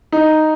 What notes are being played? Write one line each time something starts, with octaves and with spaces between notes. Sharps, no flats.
D#4